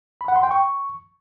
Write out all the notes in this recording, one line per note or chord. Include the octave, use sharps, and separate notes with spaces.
B5
F#5
C6
G5
C#6